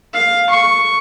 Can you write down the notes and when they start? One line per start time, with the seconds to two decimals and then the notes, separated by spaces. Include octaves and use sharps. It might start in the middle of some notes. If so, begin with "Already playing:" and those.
0.14 F5
0.50 C#6